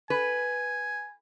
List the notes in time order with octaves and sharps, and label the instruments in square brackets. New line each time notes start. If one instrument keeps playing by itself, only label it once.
[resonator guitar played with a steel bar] B4 [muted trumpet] G#5